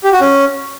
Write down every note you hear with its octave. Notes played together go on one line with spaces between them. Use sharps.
G4
F#4
C#4